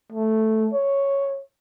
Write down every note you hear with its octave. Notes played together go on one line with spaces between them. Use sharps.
A3
C#5